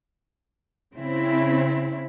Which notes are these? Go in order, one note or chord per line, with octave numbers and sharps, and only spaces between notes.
C#3 C4 E4